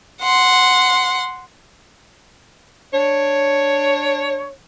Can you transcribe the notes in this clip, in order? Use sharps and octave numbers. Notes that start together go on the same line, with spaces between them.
F#5 C6
D4 C#5